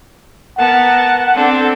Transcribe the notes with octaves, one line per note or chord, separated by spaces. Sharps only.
B3 A#4 F#5 A5
C4 D4 A4